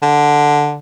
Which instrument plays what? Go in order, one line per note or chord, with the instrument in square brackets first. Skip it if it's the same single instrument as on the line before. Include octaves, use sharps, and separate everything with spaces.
[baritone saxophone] D3